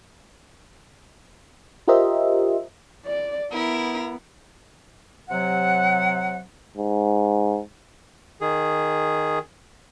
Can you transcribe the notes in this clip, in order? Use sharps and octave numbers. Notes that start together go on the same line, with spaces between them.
F4 G4 A#4 C5 D#5 E5
D5
B3 E4 A#4
C3 F#3 F#5
G#2
D#3 G#4